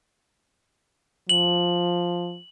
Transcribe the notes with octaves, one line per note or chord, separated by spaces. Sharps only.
F3 F#7